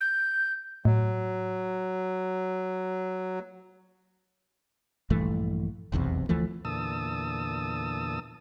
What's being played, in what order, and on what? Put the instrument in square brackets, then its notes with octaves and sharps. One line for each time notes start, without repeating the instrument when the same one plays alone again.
[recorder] G6
[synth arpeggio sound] A2 [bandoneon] F#3
[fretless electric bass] A#1 G2 E3 A3
F1 B1 E2 C3
D2 E3 F3 A3
[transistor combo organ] E2 A#2 D3 A5 D#6 E6